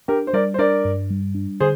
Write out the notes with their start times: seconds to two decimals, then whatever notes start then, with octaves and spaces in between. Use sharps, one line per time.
0.08 D4 G4 A#4
0.27 C5
0.33 G3 A#4 D5
0.54 C5
0.58 D4 A#4 D5
0.85 G2
1.10 G3
1.35 D4
1.60 D3 G#4 C5